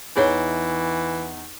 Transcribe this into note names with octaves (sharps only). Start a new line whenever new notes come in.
E2 E3 D#4 G#4 C#5 G7